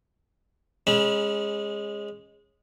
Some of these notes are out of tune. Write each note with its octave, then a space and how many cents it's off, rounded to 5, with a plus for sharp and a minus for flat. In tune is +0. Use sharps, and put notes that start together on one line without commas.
G#3 -10 C#4 -25 B5 -30